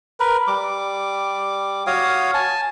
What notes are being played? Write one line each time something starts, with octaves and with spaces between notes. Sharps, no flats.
A#4 B4
G3 D6
F#4 C#5 F5 D#6
G#5 A5